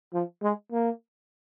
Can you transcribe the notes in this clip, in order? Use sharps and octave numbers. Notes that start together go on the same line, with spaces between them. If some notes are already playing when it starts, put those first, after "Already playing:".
F3
G#3
A#3